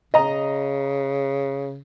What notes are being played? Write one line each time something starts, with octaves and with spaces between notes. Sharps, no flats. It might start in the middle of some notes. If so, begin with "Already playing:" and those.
C#3 D#5 A#5